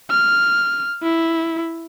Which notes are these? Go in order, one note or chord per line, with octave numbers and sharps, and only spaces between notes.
F6
E4